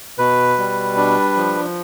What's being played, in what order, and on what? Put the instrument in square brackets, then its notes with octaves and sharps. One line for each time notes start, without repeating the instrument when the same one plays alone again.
[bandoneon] B2 B4
G3
D4
F3